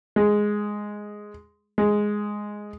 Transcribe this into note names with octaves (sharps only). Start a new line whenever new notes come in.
G#3
G#3